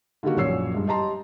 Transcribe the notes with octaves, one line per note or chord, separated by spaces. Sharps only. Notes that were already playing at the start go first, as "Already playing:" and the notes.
D3 D#3 G3 A#3 F#4
A#1 F#2 C#5 E6 C7
G2 G#3
G4 D#5 A5 A#5 C6